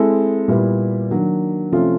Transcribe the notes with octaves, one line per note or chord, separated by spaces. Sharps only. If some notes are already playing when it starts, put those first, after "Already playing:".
Already playing: G#3 C4 E4 A4
A#2 G3 B3 E4
D#3 F#3 A#3 D4
C3 F3 A3 C#4 F4